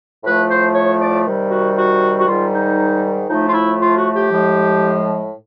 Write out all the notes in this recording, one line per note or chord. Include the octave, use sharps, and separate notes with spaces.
A2 F3 A3 B4
C5
C#5
D5
C3 D#3 G3
F#4
F#4
F#4
G#2 D#3 G3 F4
D#4
A2 F3 A3 D#4
F4
E4
F4
F#4
G4
A2 F3 G#3